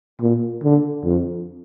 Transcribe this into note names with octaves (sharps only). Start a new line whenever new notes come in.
A#2
D3
F2